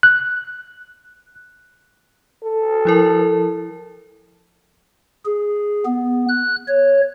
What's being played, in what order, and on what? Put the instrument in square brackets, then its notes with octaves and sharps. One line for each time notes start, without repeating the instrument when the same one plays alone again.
[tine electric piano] F#6
[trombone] A4
[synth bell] F3 E4 A#4
[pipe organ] G#4
B3
F#6
C#5